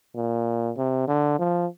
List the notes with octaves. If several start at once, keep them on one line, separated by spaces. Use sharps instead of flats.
A#2
C3
D3
F3